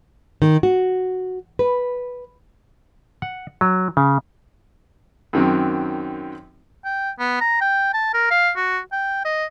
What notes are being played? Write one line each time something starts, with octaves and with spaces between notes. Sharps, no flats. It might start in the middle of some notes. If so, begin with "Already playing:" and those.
D#3
F#4
B4
F#5
F#3
C#3
F#2 D#3 F#3 C4
G5
B3
A#5
G5
A5
A#4
F5
F#4
G5
D#5